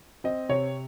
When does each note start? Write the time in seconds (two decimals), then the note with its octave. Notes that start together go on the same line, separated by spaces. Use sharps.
0.24 C4 D#5
0.49 C3 C#5